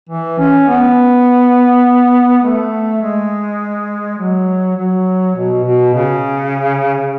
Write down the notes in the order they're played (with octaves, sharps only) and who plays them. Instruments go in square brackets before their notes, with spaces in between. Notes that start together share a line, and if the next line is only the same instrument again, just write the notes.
[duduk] E3
C#4
B3
A3
G#3
F#3
F#3
B2
B2
C#3